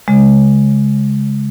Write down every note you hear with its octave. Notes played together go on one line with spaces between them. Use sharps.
C#3 G#3